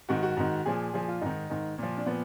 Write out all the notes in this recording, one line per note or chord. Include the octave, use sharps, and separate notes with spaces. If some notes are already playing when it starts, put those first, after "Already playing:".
G#2 D#3 F#4
F#4
G#2 D#3
A#2 F3 G#4
A#2 F3 G#4
F4
G#2 D#3 D#4
G#2 D#3
A#2 F3
D4
A#2 F3 B3